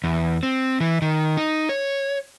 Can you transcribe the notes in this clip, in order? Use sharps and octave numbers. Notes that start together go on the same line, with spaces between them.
E2
C4
E3
D#3
D#4
C#5